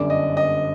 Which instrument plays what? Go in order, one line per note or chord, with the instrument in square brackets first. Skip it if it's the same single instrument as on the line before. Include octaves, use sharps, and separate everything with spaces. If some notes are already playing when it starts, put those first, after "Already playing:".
Already playing: [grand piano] G1 F#2 D3 G3 [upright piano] D5
[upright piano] D#5
D#5